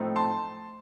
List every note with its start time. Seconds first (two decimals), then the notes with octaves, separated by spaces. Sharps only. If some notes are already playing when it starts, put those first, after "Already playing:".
Already playing: A2 F3 A3 C4 D#4
0.16 A5 C6